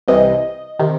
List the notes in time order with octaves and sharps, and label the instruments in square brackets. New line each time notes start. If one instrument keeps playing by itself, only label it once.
[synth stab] C2 C3 E3 D#5
C3 D#3